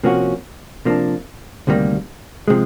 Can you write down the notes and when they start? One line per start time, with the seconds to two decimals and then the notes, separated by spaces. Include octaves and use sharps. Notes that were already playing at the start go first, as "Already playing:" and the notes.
0.03 C3 F3 A#3 C#4 F#4
0.85 C3 F3 A#3 D4
1.67 D2 C3 D#3 G3 A#3
2.48 C3 F3 G#3